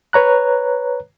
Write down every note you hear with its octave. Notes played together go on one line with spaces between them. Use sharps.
B4 C#5 A#5 F#6